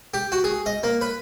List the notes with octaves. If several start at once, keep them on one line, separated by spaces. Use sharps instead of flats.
G4
F#4
G#4
D#5
A#3
B4